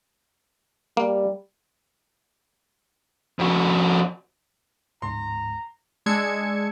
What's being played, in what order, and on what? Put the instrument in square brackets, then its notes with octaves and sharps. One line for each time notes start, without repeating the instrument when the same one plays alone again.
[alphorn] G3 [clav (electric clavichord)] A#3
[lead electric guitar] F2 F#4
[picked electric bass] D1 G#2 [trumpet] A#5 [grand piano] C6
[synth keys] G#3 D4 E6 G#6 C#7